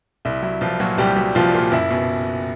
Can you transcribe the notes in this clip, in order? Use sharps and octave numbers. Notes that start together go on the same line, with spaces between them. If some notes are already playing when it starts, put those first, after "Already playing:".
C2 E4
F#3 E4
C2 F3 F4
A#2 F#3 F#4
C2 G3 G4
F#3
C2 F3 F4
A#2
F#1 E4
B2